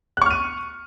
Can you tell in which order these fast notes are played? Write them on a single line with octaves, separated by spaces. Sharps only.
F#6 C#6 F6 D#7